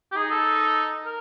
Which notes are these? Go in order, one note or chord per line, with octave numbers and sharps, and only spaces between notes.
G4
D#4 G#4
A4
A#4